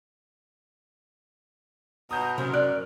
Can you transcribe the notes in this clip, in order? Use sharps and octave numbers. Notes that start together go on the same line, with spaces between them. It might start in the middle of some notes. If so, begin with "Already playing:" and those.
B2 A#5 D#6 G6
F#2 C3 A#4
D5 F#6